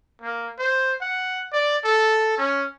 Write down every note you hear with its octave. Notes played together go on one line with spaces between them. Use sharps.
A#3
C5
F#5
D5
A4
C#4